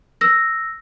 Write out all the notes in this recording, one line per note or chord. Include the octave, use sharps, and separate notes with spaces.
E6 A#6